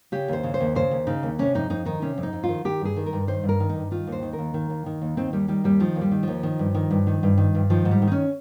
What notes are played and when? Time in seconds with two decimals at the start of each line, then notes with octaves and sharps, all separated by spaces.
0.12 C#3 G4
0.28 D#2 C5
0.43 C#3
0.54 C5
0.60 D#2
0.75 C#3 C5
0.91 D#2
1.07 C#3 D#4
1.23 D#2
1.39 C3 C#4
1.55 F2 D#4
1.70 F2 D#4
1.85 D#3 D#4
2.02 C3 C#4
2.18 F2
2.23 D#4
2.33 F2
2.43 F4
2.49 D#3
2.65 D#3 G4
2.81 G2 G#4
2.96 D#3
3.06 A#4
3.13 G2
3.27 D#3 C5
3.43 G2
3.49 A#4
3.60 D#3
3.69 D#4
3.75 G2
3.91 D#3 F4
4.07 D#2
4.12 C5
4.22 D#3
4.33 A#4
4.38 D#2
4.54 D#3
4.70 D#2
4.86 D#3
5.02 D#2
5.17 D#3 C4
5.33 D#2 G3
5.48 D#3 G3
5.64 D#2 G3
5.80 D#3 F3
5.96 D#2
6.01 G3
6.11 D#3
6.23 D#2 F3
6.43 D#3
6.59 G2
6.74 D#3
6.91 G2
7.07 D#3
7.23 G2
7.38 D#3
7.55 G2
7.70 D#3 F3
7.85 G#2
7.91 G3
8.02 D#3
8.07 D#4
8.12 C#4